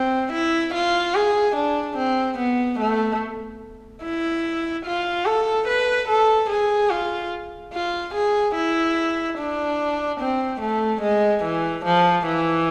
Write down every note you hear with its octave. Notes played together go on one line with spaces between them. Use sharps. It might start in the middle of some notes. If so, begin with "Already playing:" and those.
Already playing: C4
E4
F4
G#4
D4
C4
B3
A3
E4
F4
A4
B4
A4
G#4
F4
F4
G#4
E4
D4
C4
A3
G#3
E3
F3
E3